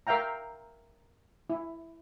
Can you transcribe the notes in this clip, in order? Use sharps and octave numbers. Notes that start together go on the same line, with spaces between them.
A#4 E5 F5 G5 A#5
E4